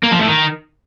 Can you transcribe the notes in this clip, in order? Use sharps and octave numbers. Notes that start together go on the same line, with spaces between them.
A#3
F3
A2
D#3